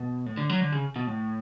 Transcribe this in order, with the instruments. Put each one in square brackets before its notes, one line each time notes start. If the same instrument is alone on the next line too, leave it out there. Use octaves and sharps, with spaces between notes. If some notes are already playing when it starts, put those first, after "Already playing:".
Already playing: [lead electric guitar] B2
A2
D3
F#3
D3
C#3
B2
A2